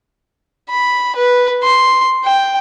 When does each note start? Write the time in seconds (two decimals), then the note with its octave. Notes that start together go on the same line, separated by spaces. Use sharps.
0.70 B5
1.16 B4
1.63 C6
2.24 G5